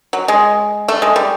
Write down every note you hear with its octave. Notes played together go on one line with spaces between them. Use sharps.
F#3
G#3
A3
G#3
G3